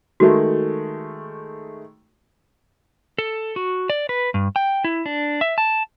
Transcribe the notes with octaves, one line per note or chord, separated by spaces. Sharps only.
D#3 G#3 A3 F#4
A4
F#4
D5
B4
G2
G5
E4
D4
E5
A5